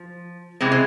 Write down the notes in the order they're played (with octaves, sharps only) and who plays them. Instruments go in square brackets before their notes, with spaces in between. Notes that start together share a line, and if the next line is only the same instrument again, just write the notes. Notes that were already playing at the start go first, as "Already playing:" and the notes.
Already playing: [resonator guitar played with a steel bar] F3
C3 E3 G#3 C4
C4